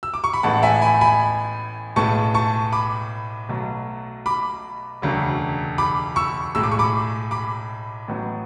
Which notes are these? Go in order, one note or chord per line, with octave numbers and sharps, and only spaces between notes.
E6
D6
C#6
B5
A1 A2 G#3 B3 F#5 A5
E5 G#5
G#5 B5
G#5 B5
B1 A2 G#3 B3 A5 C#6
A5 C#6
B5 D6
B1 B2 F#3 A3
B5 D6
E1 D2 C#3 F#3
B5 D6
C#6 E6
B1 A2 G#3 E6
D6
C#6
B5 D6
B5 D6
A1 A2 F#3 B3